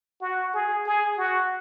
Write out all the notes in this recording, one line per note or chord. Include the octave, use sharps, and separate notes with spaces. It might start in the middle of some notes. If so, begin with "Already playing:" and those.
F#4
G#4
G#4
F#4